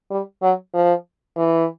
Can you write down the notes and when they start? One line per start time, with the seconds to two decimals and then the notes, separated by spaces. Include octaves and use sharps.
0.11 G3
0.42 F#3
0.74 F3
1.37 E3